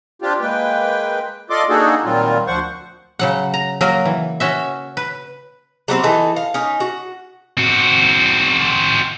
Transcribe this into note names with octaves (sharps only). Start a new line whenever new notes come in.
C4 D4 F4 G4
G#3 A#3 B4 G5
F4 A4 D5 D#5 C6 D6
A#3 D4 D#4 F#4 G#4 A4
A#2 D#3 F#3 G3 C4 F4
D2 F3 C5 F#5 C#6
C#3 F#3 F#5
A#5
F#3 A#3 A#4
E3
C#4 F#4 E5
B4
F#3 G3 C4
E3 D#4 A4
F5
C#4 D#4
F#4
C4 F#4